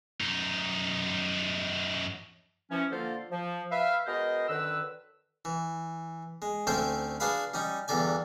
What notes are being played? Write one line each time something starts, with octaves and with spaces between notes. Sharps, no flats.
F#2 D#4
E3 F3 C#4
D3 F3 A#3 F4 A4 C5
F3
B4 E5 F5
G#3 B3 F#4 A#4 C5 D#5
F#2 D3 D#3 B4 E6
E3
G#3
D2 A3 C4 C#4 C5 G5
D4 F#4 G#4 B4 F5 B5
G3 C#4 D#4
E2 G2 D3 D5 G#5